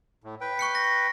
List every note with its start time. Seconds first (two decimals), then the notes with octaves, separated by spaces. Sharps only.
0.24 A2
0.41 B4 G5
0.59 C#6 F#6 C#7
0.75 A#6